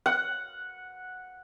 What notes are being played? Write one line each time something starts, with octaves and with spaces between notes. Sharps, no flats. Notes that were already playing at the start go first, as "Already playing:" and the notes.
F#5